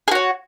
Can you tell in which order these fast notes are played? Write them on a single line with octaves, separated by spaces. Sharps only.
G#4 F#4 C#5